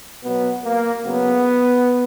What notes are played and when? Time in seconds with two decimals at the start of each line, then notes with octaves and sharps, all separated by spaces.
0.23 B2 F#3 B3
0.64 A#3
1.04 C#3 F#3 B3